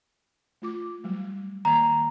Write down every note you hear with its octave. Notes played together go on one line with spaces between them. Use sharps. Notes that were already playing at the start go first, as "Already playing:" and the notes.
A3 F4 D6
F#3 G3 A3
D#3 A#3 A#5